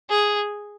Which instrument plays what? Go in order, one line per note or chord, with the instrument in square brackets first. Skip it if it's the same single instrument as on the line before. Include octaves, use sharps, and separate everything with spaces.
[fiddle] G#4